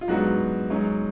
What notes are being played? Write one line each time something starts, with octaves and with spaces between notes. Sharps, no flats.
F4
G#2 F#3 B3 D4 F#4
G#2 F#3 C#4